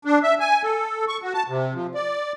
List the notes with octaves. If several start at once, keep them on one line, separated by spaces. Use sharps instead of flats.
D4
E5
G#5
A4
C#6
F#4
A5
C3
F3
D5